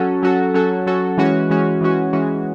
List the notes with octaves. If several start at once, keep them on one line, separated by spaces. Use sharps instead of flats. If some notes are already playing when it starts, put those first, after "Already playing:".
Already playing: F#3 C#4 F#4 A4
F#3 C#4 F#4 A4
F#3 C#4 F#4 A4
F#3 C#4 F#4 A4
E3 G#3 C#4 F#4
E3 G#3 C#4 F#4
E3 G#3 C#4 F#4
E3 G#3 C#4 F#4